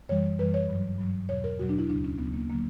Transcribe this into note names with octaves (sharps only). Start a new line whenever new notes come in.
F#2 E3 G3 C#5
F#2 E3 G3 B4
C#5
G2 F#3
G2 F#3
E2 B2 F#3 C#5
A#4
E2 B2 F#3 F#4
D4
E4
D2 C#3 F#3 D4
C#4
D2 C#3 F#3 B3
A#3
D3 F#3 A#3